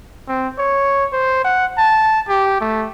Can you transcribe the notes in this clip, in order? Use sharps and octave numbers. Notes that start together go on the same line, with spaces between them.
C4
C#5
C5
F#5
A5
G4
A3